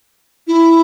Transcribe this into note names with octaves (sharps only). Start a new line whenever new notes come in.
E4